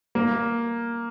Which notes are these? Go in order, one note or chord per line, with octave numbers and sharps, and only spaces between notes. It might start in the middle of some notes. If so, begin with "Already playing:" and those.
A#3